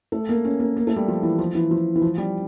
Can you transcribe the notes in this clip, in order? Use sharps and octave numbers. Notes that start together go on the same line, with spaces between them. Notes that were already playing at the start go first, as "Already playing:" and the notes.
A3
A#3
C#4
A#3
A#3
A3
G3
F3
E3
F3
E3
F3
E3
F3
G3